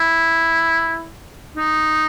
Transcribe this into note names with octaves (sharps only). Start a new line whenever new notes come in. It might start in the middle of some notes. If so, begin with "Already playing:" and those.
Already playing: E4
D#4